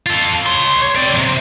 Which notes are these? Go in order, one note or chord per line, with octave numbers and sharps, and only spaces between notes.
F4 A4
C#5 C6
C4 D5
E2 C3